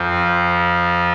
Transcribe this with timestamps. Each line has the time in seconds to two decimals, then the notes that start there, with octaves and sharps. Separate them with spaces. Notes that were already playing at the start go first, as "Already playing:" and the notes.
Already playing: F2 F3
0.09 C4